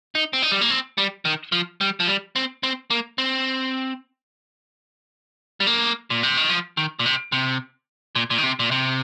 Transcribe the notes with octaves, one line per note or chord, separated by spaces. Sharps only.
D#4
C4
D#4
G3
A#3
C4
G3
D#3
F3
G3
F3
G3
C4
C4
A#3
C4
G3
A#3
A#2
C3
D#3
F3
D#3
A#2
C3
C3
A#2
A#2
D#3
C3
A#2
C3